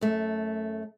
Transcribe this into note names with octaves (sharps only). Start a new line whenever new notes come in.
F#2 A3